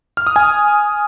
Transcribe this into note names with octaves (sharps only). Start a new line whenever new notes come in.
F6
D#6
G#5